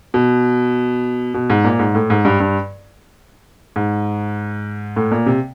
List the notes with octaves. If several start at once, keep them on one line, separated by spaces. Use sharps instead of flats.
B2
B2
G#2
A#2
G#2
A2
G#2
G2
G2
G#2
A2
A#2
C3